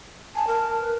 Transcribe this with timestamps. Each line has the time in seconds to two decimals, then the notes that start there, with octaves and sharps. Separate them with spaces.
0.35 G#5 A5
0.47 A#4
0.79 B4